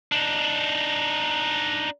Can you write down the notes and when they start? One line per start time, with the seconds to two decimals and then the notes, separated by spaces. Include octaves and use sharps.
0.12 D4 D#4